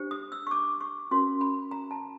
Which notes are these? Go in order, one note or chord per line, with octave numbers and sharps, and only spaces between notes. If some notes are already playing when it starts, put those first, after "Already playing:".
Already playing: D4 G4 C5
D#6
E6
C#6
D6
C#6
C#4 F#4 A#4 C6
B5
A#5
A5